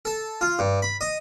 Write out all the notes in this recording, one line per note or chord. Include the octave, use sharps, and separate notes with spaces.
A4
F4
G2
B5
D#5